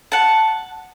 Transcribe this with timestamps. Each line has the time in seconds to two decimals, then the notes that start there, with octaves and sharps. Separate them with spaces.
0.12 F#5 A5